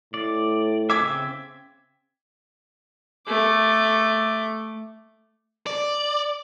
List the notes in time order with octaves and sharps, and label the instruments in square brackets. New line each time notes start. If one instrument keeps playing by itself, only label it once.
[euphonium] A2 [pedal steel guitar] D5
[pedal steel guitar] C#3 C4 E5 [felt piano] D6 G#6 B6
[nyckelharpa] A3 D6
[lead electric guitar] D5